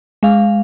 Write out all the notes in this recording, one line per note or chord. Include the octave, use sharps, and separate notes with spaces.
G#3 F5